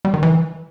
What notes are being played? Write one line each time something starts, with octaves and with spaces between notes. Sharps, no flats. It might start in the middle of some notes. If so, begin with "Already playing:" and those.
G3
D#3
E3